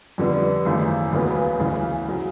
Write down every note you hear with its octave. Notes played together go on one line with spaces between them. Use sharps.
F2 D3 G3 B3 D4
G#1 F#2 C#3 E3 A3
E1 D2 C#3 F#3 B3
D2 C#3 E3
C#3 F#3